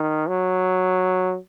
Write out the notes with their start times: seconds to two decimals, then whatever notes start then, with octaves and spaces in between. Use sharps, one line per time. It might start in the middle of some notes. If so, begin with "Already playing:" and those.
Already playing: D#3
0.28 F#3